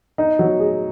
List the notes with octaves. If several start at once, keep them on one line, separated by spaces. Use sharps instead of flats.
D#4
F#3
G#4